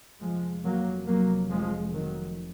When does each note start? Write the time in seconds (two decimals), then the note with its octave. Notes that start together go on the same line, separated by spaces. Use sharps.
0.20 F1 F2 F3 G#3
0.64 F#3 A#3
1.06 F#3 A#3
1.49 F3 G#3
1.92 D#3 F#3